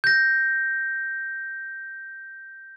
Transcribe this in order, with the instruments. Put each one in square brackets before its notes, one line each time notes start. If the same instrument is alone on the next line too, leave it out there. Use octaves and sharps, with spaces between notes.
[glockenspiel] G6 A#6